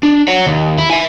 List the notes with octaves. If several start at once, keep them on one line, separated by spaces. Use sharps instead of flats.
D4
C#5 F#5
D#2
E4
E5 G#5